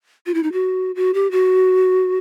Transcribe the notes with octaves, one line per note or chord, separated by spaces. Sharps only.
F4
E4
D#4
F#4
F#4
G4
F#4